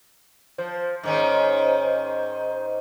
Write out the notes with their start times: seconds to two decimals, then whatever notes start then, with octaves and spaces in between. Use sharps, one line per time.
0.58 F3 C5
1.03 G#2 D#3 C#4